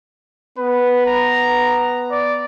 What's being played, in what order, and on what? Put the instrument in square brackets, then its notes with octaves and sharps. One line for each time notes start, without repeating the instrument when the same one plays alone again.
[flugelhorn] B3 [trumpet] B4
[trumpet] A#5
D5